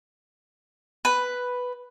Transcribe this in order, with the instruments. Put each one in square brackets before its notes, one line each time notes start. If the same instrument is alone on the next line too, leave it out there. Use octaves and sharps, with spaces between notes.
[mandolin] B4